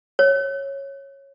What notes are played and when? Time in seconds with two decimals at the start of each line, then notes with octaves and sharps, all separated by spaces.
0.19 C#5